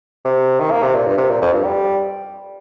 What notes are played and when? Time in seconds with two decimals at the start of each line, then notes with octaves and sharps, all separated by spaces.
0.25 C3
0.60 D#3
0.71 A#3
0.83 C3
0.95 A#2
1.07 G2
1.18 C3
1.30 A#2
1.42 F2
1.53 G2
1.65 G3